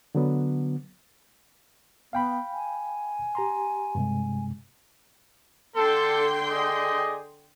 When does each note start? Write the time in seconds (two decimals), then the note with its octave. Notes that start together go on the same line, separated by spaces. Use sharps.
0.15 D3 F#3 B3
2.13 B3 F5 G5 B5
2.52 G#5
3.35 G4 A#5 C6
3.95 G2 C3 G#3
5.76 D3 A4 G5 C6
6.50 G#4 D5 D#5